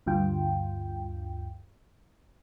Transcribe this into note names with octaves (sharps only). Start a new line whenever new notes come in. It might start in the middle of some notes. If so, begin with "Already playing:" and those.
D2 G2 F4 G5